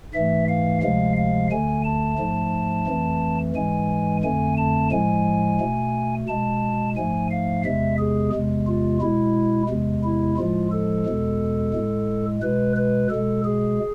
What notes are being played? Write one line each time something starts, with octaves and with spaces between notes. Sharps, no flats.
G#2 E3 A3 E5
F5
D2 C3 F3 G#3 F5
F5
D2 D3 A3 G#5
A5
G#2 F3 A3
F2 E3 A3
G#2 E3 G#3 G#5
F2 D3 A3 G#5
A5
A2 F3 G#3 G#5
B2 A3
B2 G#3 A5
G#2 F3 A3 G#5
F5
E2 C3 G#3 E5
G#4
E2 C3 G#3
F4
B2 G#3 E4
E2 C3 G#3
E4
A2 F3 G#3 F4
A4
E2 B2 G#3
A2 G#3
B2 G#3 B4
B4
B2 G#3 A4
G#4